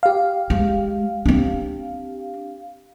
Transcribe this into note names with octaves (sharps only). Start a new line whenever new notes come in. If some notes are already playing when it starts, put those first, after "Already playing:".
G4 F5
G#3
C4 D4